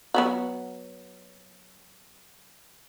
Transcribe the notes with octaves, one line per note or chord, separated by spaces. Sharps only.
F#3 B3 F#4